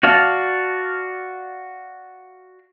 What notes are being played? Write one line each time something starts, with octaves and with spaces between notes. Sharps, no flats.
F#4 D5 F5 A5